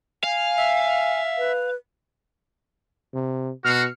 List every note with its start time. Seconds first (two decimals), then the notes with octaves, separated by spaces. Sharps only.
0.24 F5 G#5
0.57 E5
1.38 B4
3.14 C3
3.65 B2 F#4 F6 C7 C#7